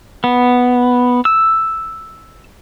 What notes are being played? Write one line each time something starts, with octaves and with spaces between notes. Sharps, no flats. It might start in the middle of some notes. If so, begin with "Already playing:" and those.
B3
E6